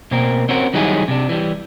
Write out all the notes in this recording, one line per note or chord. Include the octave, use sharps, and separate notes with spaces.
B2 A#3 C4 A#4
C4 C#4 F#4 A#4
D#3 F#3 G3 D#4 E4 G#4
C3 D4
E3 G3